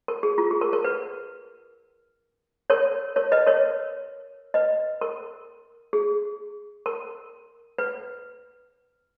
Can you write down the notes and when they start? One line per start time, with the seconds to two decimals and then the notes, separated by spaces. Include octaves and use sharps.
0.08 A#4
0.23 G#4
0.38 F4
0.51 G#4
0.61 A#4
0.73 A#4
0.84 B4
2.70 A#4 C#5
3.16 A#4 C#5
3.32 B4 D#5
3.47 A#4 C#5
4.54 B4 D#5
5.01 A#4
5.93 G#4
6.86 A#4
7.78 B4